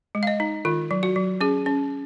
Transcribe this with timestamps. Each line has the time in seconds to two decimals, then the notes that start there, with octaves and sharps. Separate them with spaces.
0.15 G#3
0.23 F5
0.27 D#5
0.40 D#4
0.65 D#3 F4
0.91 F#3
1.03 F#4
1.16 F#3
1.41 C#4 G#4
1.66 C#4